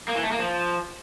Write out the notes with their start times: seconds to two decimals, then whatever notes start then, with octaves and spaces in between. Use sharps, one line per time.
0.08 A#3
0.16 E3
0.23 A3
0.31 A#3
0.39 F3